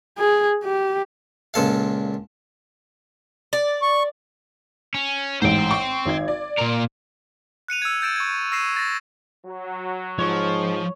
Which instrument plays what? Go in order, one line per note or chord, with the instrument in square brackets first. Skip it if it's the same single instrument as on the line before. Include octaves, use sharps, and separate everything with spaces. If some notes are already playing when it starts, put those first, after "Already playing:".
[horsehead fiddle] G#4
G4
[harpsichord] C#2 A#2 A4 F5
[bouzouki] D5
[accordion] C#6
[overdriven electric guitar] C#4
[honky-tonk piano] A1 G#2 [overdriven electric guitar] C5 G5
[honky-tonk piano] C#6
G#1 D#4 G#6
D5
[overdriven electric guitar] A#2 A#4
[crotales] F#6 C#7 D#7 F7
E6 G#6
E6 G6 A6 D7 E7
C#6 G#6
C#6 E6 A#6 C7 D#7 E7
A6 A#6
[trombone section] F#3
[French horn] G#2 [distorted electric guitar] F3 [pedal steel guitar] C#5 C#6